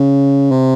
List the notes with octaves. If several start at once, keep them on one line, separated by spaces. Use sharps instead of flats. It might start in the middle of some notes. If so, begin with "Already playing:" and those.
Already playing: C#3
C3